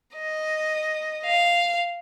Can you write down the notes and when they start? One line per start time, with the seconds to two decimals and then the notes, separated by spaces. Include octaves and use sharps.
0.16 D#5
1.25 F5